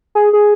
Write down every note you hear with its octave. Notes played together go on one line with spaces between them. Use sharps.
G#4
G#4